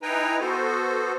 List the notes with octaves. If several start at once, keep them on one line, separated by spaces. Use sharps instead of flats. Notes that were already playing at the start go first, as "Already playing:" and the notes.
D#4 E4 B4 G5 G#5 A#5
B3 F#4 A4 C5